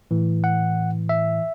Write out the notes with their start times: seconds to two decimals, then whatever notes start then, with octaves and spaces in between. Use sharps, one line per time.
0.11 A2 E3
0.44 F#5
1.09 E5